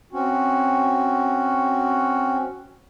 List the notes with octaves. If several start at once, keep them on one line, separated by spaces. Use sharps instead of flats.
C4 C#4 F#4